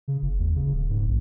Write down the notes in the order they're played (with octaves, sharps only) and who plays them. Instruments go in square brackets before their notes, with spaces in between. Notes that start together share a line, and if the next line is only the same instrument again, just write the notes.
[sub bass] C#3
F#1
D#2
C#3
D1
G#2
A#1